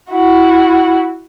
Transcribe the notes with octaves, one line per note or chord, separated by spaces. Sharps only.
E4 F#4